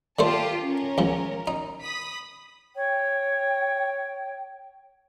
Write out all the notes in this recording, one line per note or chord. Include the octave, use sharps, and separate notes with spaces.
D3 A3 F4 G4 C5 A5
C#4 A#4
C#2 F3
D#4
B5 D#6 B6
C#5 G5